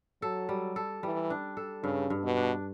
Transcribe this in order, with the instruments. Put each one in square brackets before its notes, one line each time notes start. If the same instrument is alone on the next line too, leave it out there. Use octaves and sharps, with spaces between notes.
[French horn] F#3 [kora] A4
[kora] G3
A4
[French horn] E3 [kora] G3
[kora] D4
A4
[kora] G2 [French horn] C#3
[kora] G2
[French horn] B2
[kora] D4